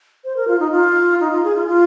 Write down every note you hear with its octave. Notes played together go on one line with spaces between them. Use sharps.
C5
A#4
F4
D#4
F4
D#4
F4
G#4
F4
F4